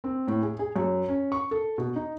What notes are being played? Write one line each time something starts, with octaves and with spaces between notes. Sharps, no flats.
C4
A2
G#4
G#4
F#2
C#4
C#6
A4
B2
D#4